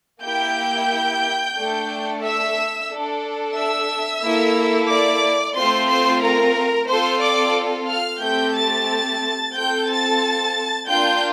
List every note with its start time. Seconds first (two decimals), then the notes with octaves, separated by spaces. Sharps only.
0.24 A#3 E4 G4 G5 G6
1.57 A3 D4 A4
2.24 E5 E6
2.90 D4 A4
3.56 E5 E6
4.23 A#3 E4 A4
4.89 D5 D6
5.56 A3 C4 F4 C5 C6
5.89 C5 C6
6.22 A#4 A#5
6.89 C4 F4 A4 C5 C6
7.22 D5 D6
7.88 F5 F6
8.22 A3 C4 G4 G5 G6
8.55 A5 A6
9.54 C4 F4 A4 G5 G6
9.88 A5 A6
10.87 A#3 D4 F4 G5 G6